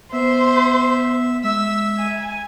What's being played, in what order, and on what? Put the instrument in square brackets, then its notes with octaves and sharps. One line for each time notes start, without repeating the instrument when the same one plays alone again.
[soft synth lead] B3 [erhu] C5 [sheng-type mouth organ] E5
[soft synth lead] G#3 [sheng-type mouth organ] E5 [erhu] E6
[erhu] G#5